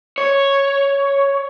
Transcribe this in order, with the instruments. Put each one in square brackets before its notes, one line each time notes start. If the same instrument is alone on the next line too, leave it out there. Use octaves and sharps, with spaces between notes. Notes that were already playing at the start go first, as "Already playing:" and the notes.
[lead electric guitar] C#5